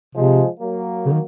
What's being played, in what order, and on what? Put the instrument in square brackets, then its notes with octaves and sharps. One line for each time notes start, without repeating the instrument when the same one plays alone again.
[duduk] C3 [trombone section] F3 G#3
[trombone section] F#3 A#3
[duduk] C#3
D#3